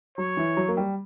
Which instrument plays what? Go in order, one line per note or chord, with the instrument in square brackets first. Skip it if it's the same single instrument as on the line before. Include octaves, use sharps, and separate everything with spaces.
[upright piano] F#3 [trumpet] C#5
[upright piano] E3
F#3
A#3
G3